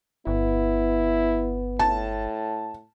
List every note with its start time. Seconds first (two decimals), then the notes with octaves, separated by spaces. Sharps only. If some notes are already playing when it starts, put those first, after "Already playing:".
0.27 G1 B3 E4
1.79 A2 A5